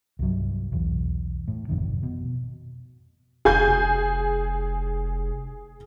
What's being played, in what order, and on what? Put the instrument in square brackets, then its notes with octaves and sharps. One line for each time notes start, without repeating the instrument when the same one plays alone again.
[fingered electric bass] C2 G2 F#3
B1 E2
A2
G#1 F2 C3 D#3
B2
[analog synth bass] F1 [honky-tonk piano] G#4 G#5 G6